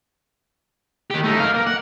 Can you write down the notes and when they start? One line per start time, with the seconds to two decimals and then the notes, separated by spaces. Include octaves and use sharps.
1.10 D#3 G4
1.23 A3 D#4
1.40 A#4 F5
1.54 A#3
1.66 F#5